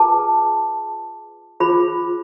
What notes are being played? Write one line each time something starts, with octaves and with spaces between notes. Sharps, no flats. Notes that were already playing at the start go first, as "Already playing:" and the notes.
Already playing: F4 G#4 B4 A5
F4 G#4 C5 B5